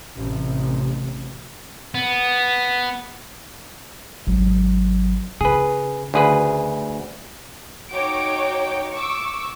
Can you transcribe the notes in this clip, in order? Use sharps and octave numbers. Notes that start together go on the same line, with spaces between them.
A1 C3
B3
G#1 F#3
C#3 G#4 B4
D2 G#4 B4
D#4 F#4 C#5 G5 D6 D7
C#6 D6 E6